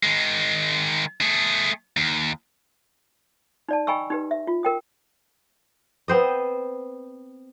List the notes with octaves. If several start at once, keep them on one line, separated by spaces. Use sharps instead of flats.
D#3 G#3
A3 G#4
D#2
D#4 D5 A5
D#5 G5 G#5 B5 C#6 E6
D#4 G4 B4
E5
F4
A#4 G5 D#6
B3 C4 C5 D#5